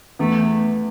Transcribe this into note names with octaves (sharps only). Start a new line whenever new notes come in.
E2 A3